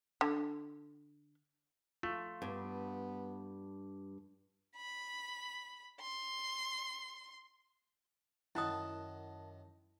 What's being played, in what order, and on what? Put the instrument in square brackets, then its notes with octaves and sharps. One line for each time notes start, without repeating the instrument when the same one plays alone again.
[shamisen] D3
[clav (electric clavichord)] A3 [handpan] F4
[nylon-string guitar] G2 [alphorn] B3
[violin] B5
C6
[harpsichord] F#2 D#3 [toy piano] E4 D#6 [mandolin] F#5 A5